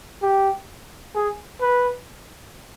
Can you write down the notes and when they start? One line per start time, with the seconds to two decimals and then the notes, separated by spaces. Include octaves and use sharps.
0.22 G4
1.15 G#4
1.61 B4